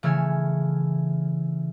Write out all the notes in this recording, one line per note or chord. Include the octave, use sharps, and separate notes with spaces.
C#3 E3 A3 E6 F6 G#6